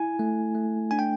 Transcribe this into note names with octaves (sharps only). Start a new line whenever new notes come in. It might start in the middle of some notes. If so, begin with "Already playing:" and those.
Already playing: E4 G#5
A3
A3
D4 G#5
G5